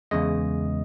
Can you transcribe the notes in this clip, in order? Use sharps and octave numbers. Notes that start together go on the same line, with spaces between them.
E2 C#3 G#3 D#5